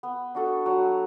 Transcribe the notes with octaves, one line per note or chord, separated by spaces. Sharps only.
B3
D4 F#4 A4
F#3